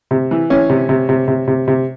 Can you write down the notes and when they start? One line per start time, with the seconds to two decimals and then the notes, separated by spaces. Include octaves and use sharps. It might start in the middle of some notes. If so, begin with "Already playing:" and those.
0.11 C3
0.31 E3
0.50 E3 C#4
0.70 C3
0.89 C3
1.09 C3
1.28 C3
1.48 C3
1.68 C3